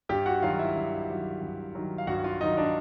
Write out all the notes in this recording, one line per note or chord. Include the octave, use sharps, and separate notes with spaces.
G2 G4 G5
F#4 F#5
D#3 F#3 F4 F5
E4 E5
G2
D#3 F#3
G2
D#3 F#3
F5
G2 F#4 F#5
F4 F5
D#3 F#3 D#4 D#5
D4 D5